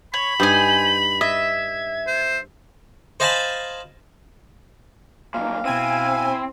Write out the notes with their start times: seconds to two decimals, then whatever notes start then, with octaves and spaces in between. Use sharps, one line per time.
0.14 C#5 B5 F#7
0.40 G2 D#4 C5 G#5
1.21 D#5 E5 G#6
2.07 C5
3.20 C5 D#5 F5 G#5 A5 B5
5.34 B1 A#2 F5
5.65 B2 C4 E4 G#5 D#7